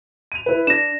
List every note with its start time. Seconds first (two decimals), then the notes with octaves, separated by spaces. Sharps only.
0.32 D#7 F7
0.46 E4 B4
0.67 D4 A#6 E7